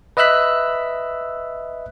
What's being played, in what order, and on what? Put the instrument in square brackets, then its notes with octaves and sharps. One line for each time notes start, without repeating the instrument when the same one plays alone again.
[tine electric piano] B4 D#5 E5 E6 F#6 B6